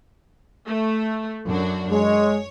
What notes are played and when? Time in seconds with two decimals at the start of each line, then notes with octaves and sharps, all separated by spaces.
0.67 A3
1.47 F#2 D4 F#4
1.91 G#3 C#5